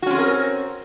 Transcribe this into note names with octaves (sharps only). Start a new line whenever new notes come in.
C4 C#4 F#4 G#4 A#4